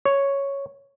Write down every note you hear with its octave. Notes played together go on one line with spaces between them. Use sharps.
C#5